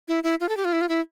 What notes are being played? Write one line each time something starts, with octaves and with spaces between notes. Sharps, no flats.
E4
E4
F4
A4
G4
F4
E4
F4
E4